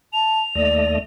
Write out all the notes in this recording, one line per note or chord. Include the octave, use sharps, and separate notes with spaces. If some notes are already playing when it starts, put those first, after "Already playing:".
A5 F7
D#2 A3 D5 D#5